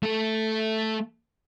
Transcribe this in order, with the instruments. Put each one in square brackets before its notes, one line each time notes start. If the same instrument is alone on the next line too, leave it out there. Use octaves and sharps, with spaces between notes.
[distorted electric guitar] A3 A4